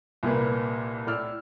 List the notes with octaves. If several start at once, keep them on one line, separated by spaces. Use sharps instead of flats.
C2 A#2 A#3 B4
A2 D5 E6 F6